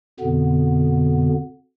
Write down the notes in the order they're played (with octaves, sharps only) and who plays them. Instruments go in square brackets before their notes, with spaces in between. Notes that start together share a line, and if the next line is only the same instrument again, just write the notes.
[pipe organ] F2 B2 D3 B3